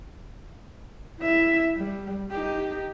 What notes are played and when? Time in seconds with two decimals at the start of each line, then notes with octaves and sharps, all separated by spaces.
1.20 E4 E5
1.77 G3
2.31 D#4 G4